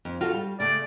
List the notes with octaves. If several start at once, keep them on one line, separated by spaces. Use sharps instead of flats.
F2
F4 F#4 A4
G3
C#3 A3 D5